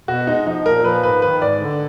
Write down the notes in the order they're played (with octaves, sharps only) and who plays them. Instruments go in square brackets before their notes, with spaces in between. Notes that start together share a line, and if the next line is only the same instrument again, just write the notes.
[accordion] B2 [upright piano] F#4
[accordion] G#3 [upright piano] D#4
[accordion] F3 [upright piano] D#4
[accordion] A#2 [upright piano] A#4
[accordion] F3 [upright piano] B4
[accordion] G#2 [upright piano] B4
[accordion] D#3 [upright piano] B4
[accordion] G#2 [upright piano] D5
[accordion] D3